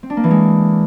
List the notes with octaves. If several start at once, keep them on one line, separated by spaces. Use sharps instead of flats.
C4
D4
A#3
E3
G#3